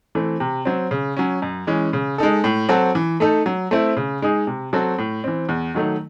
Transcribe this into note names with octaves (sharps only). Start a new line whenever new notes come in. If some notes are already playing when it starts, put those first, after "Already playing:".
E3 A3 C4
C3
F#3 C4
C#3
F#3 C#4
F#2
E3 G#3 C#4
C#3
G#3 D#4 A4
A2
F#3 C4 F#4 A4
E3
A3 D#4 A4
F#3
A3 C4 E4
C#3
G#3 D#4 G#4
C3
F#3 C4 F#4 A4
A2
E3 C4
E2
D#3 F#3 A3 D#4